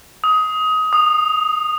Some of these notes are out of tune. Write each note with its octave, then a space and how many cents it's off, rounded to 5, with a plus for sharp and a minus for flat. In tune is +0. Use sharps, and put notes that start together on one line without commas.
D#6 +20
D#6 -15